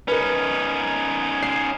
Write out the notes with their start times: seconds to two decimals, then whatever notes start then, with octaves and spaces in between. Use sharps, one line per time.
0.08 C#4 D#4 A#4 B4
1.43 C7